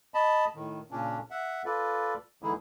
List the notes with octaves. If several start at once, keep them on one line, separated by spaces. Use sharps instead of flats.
D#5 A5 B5
A2 D#3
A#2 C#3 C#4 D4
E5 F#5
F4 A4 B4 D5
D3 E3 G#3 D#4 E4 G#4